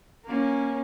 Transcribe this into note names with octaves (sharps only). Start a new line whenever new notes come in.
A#3 C#4